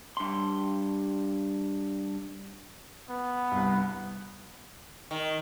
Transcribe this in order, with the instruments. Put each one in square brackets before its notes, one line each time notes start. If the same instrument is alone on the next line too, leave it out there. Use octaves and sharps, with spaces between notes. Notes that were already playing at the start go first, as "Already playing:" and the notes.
[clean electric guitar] G2 C6
[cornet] B3
[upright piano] C2 G2
[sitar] D#3